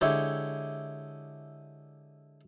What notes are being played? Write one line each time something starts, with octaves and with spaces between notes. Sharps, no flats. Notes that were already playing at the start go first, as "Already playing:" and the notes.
D3 G#3 E4 G4 C#5